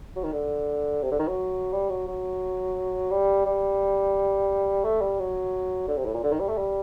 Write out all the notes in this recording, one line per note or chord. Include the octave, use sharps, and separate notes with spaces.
F#3
D#3
D3
C3
D3
D#3
F#3
G3
F#3
F#3
G3
G3
A3
G3
F#3
D3
C3
A2
A#2
D3
D#3
G3
A3
G3